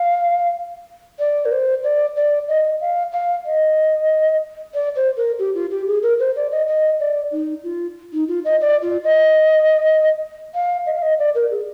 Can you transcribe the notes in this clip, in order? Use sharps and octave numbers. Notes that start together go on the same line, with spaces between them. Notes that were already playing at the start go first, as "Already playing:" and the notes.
Already playing: F5
D5
A#4
C5
D5
D5
D#5
F5
F5
D#5
D5
C5
A#4
G4
F4
G4
G#4
A#4
C5
D5
D#5
D#5
D5
D#4
F4
D#4
F4
D#5
D5
F4
D#5
F5
D#5
F5
D#5
D5
A#4
G#4